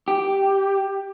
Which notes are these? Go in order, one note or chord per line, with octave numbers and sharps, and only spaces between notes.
G4